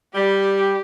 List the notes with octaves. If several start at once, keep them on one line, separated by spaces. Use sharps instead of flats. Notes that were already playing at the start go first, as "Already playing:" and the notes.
G3 G4